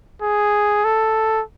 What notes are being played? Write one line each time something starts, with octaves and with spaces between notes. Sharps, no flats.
G#4
A4